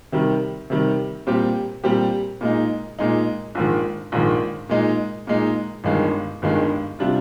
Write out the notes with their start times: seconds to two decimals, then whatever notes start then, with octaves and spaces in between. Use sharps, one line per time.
0.12 C3 D#3 G3
0.70 C3 D#3 G3
1.27 A#2 G3 C4 G4
1.84 A#2 G3 C4 G4
2.41 A#2 G#3 D#4
2.99 A#2 G#3 D#4
3.55 A#1 G#2 D#3
4.12 A#1 G#2 D#3
4.69 A#2 G#3 D#4
5.27 A#2 G#3 D#4
5.84 G1 G2 D#3 G#3
6.42 G1 G2 D#3 G#3
6.99 C3 G3 D4 F4